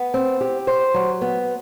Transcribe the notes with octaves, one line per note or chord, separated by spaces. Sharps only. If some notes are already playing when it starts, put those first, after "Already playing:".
Already playing: B3
C4
G4
C5
F#3
B3